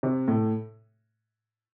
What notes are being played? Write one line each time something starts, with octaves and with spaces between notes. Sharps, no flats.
C3
A2